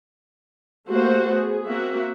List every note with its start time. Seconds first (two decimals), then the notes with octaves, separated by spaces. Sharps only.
0.90 A3 A#3 F#4 G4 C5
1.31 B3 G#4
1.67 A#3 C4 F#4 E5